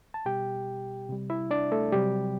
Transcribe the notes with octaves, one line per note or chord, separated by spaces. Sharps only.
A5
B2 G3 G4 G5
C3 G3
E4 E5
D4 D5
A3 A4
C3 F#3 G3 G4